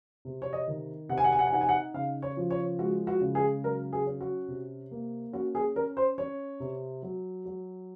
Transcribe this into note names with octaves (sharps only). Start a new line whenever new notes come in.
C3
C#5
D#5
D#3
C3 F#5
G#5
F#5
G#5
F#5
G#5
D#4 F#5
G#5
F#5
C#3 F5
C#5
F3
C#5
G#3 F#4
F#4
C#3
G#4
F#3 A#4
G#4
C#4
F#4
C3
A#3
C#4 F#4
G#4
C#4 A#4
C5
C#4 C#5
C3
F#3
F#3